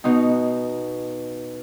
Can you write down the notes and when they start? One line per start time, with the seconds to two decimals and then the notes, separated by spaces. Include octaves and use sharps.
0.04 B2 D#4